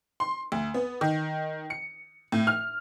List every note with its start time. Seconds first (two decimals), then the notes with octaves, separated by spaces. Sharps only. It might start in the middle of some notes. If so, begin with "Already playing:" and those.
0.20 C6
0.52 D2
0.74 B3
1.01 D#3
1.70 C#7
2.32 A2
2.47 F6